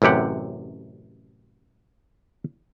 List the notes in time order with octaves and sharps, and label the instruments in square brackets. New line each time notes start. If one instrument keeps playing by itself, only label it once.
[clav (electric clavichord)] A1 F#2 C3 G4 F#5